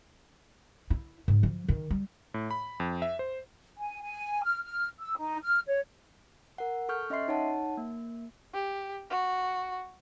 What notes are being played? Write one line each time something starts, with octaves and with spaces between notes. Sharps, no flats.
E4
G#2
F3
D#3
G3
A2
B5
F2
E5
C5
G#5
G#5
F6
F6
E6
D#4
F6
C#5
A#4 F#5
A4 C#6 F6 G6
C#4 D#5 E5 C6 C7
D#4 C#5 F#5 A5
A#3
G4
F#4